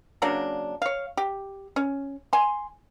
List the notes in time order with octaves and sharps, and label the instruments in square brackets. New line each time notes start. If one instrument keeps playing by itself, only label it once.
[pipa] C#3 F#3 A#3 D4
C#5 F5
G4
C#4
G#5 C6